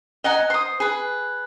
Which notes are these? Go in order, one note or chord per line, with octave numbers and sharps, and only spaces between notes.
D#5 F#5 G#5 A#5
C5 D#6
G#4 B4